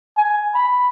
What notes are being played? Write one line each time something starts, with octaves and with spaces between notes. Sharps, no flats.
G#5
B5